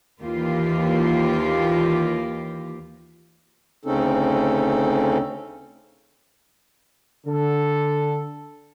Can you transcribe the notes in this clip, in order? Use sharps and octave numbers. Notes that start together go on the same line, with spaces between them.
D#2 E3 A#3 F4 G4
D2 C#3 C4 C#4 D#4 A4
D3 A4